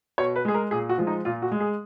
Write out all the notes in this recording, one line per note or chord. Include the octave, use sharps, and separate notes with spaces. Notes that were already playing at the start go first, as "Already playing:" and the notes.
B2 C#5
B4
G#3 G#4
A#4
A#2 G#4
F#4
F3 G#3
D#4
A#2 F4
F#4
G#3
G#4